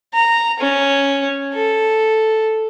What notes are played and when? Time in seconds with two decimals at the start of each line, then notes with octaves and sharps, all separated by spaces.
0.13 A#5
0.59 C#4
1.54 A4